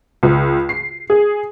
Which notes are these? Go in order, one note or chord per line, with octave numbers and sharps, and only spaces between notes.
C#2
C7
G#4